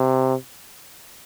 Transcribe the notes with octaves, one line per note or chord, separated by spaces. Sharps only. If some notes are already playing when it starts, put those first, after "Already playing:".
Already playing: C3